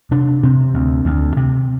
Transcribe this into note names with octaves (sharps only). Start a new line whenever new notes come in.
C3 D4
C3 C4
D2
D2
C3